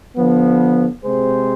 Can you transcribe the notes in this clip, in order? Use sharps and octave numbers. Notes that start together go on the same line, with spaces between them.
D3 F3 B3
C3 G#3 C4 G#4 C5